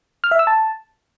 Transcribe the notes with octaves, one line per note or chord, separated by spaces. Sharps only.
F6
E5
E6
A5